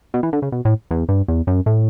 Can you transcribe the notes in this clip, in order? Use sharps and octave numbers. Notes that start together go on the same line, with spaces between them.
B2
E3
D3
C#3
B2
A2
E2
G2
E2
F#2
A2